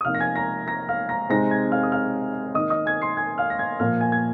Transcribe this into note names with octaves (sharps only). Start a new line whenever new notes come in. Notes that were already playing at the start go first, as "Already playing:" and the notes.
D#6
C3 F3 A#3 D#4 F5 F6
A#6
G#5 G#6
A#5 A#6
A#5 A#6
F5 F6
A#5 A#6
C3 G#3 C4 D#4 A#5 A#6
G#5 G#6
F5 F6
D#6
F5 F6
D#3 A#3 D#4 D#5 D#6
D#5 D#6
G#5 G#6
C6 C7
G#5 G#6
F5 F6
A#6
G#5 G#6
A#2 F3 A#3 F5 F6
G#5 G#6
G#6